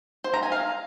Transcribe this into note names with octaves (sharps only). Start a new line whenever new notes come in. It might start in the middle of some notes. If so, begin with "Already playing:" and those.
C5
A#5
G#5
F5